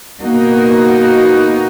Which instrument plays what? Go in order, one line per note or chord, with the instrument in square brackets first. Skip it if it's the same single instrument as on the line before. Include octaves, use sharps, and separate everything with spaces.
[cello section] B2 A#3 D#4 F#4